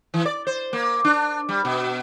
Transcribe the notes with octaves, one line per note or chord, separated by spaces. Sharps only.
E3
D5
C5
A#3
D4
G3
B2